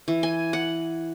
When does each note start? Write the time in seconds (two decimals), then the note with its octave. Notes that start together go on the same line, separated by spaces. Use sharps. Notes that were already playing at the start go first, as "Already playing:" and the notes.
0.08 E3
0.23 G#5
0.53 F#5